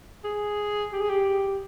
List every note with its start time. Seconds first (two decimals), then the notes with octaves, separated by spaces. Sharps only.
0.25 G#4
0.93 G4
1.01 G#4
1.10 G4